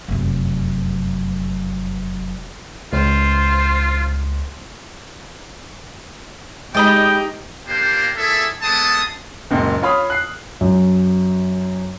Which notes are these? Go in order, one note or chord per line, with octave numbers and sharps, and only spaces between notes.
F1 F#2
C#2 F4 C5
G#3 D#4 G4 D5 D#5 G5 B5
A#3 D4 F4 G4 C5
A#3 E4 G#4 A4 D5 E5
G#3 B3 A4 A5 C6 D#6
F#1 C#2 A#2
F4 C#5 F5 B5 D#6 F6
F#6 C7
F#2